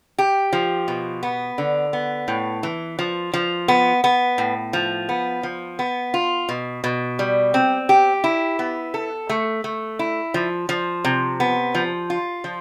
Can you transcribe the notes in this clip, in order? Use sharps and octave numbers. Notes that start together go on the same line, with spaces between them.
G4
F3
B2
B3
D3
B3
A2
E3
F3
F3
B3
B3
A2
F3
B3
F3
B3
F4
B2
B2
G3
C4
G4
E4
B3
A4
A3
A3
E4
F3
F3
C3
B3
F3
F4
F3